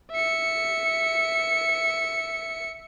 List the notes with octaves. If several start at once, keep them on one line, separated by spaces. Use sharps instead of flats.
E5 C#7